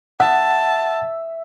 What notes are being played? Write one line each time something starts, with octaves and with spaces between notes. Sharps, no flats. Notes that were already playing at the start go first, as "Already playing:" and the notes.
E5 F#5 A5